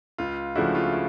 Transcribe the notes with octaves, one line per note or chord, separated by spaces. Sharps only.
C#2 F4
C#3 F3 A3 D4 E4 F#4
F4
E4